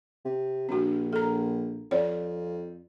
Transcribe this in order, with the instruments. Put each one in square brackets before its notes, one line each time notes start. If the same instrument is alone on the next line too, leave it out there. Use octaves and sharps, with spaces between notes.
[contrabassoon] C3
[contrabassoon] A#1 [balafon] D4 F#4
[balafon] A4 A#5
[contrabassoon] F2 [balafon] C#5 D5